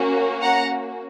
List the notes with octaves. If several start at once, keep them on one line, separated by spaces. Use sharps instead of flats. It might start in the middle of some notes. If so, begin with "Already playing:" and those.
Already playing: A#3 C#4 F#4
F#5 A#5